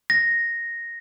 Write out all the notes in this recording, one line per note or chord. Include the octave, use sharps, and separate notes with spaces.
A#6